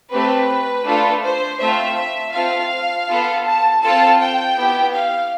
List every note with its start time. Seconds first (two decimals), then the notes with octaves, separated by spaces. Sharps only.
0.11 A3 C4 G4 B4
0.85 A3 D4 F4 A4
1.23 C5
1.60 A3 C4 F4 E5
2.33 C4 F4 A4 F5
3.08 B3 F4 A4
3.45 A5
3.82 C4 F4 A4 A5
4.19 G5
4.57 B3 E4 G4
4.94 F5